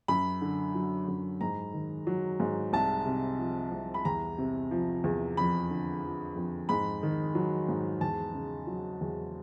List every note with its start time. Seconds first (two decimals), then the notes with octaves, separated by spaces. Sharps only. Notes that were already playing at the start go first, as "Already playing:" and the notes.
0.08 F#2 B5
0.41 D3
0.75 F#3
1.08 F#2
1.41 G#2 A#5
1.74 D#3
2.07 F#3
2.40 G#2
2.73 C2 A5
3.05 C3
3.39 F3
3.71 C2
3.94 B5
4.05 E2 A#5
4.38 C3
4.71 F3
5.04 E2
5.37 F2 B5
5.70 D3
6.03 F3
6.36 F2
6.69 G#2 B5
7.03 D#3
7.35 F#3
7.69 G#2
8.01 E2 A5
8.34 C#3
8.67 F#3
9.01 E2